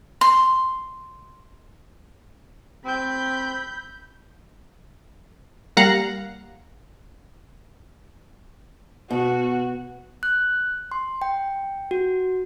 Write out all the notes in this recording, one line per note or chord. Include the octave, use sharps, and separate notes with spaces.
C6
C4 B5 G6
G3 A#3 F5 F#5 A#5
B2 F#4
F#6
C6
G5
F#4